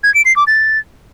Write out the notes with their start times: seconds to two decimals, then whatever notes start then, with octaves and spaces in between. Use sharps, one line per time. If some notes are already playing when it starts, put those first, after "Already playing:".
0.03 G#6
0.14 D7
0.25 C7
0.36 D6
0.47 A6